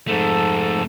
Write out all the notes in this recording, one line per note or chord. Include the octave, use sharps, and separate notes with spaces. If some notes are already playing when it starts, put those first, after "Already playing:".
F2 G#2 A3 A4